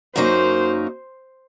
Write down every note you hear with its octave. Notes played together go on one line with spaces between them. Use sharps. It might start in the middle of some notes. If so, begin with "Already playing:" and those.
F#2 F#3 A#3 D#4 C5